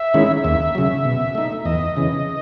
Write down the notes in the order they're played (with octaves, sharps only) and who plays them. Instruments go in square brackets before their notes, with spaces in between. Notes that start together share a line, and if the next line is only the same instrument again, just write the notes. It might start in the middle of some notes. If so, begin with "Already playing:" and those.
Already playing: [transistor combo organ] E5
D#3 G#3 C#4 E4
D#2 E5
C#3 F#3
B2
A3 D#4
E2 D#5
C#3 E3